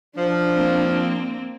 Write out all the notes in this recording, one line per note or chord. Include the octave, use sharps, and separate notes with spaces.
F3 D4
A#3 C4